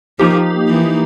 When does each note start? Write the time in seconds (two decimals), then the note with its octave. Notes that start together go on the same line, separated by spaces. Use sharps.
0.19 F3 A#3 D#4 G4
0.68 E3